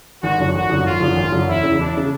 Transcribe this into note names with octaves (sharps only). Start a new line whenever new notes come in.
G#1 F#4
F#2 D3 F3
G#1 F#4
F#2 D3 F3
G#1 F4
F#2 D3 F3
G#1
F#2 D3 F3
E1 E4
E2 C#3
E1 D4
C#3